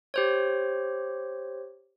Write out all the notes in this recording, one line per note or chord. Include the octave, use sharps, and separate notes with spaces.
G4 C5 C#5